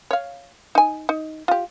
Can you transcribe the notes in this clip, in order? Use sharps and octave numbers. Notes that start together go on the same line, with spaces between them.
C#5 F5
D#4 G#5
D#4
F4 G4